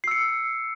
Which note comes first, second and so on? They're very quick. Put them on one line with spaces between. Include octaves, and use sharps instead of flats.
C7 E6 C#7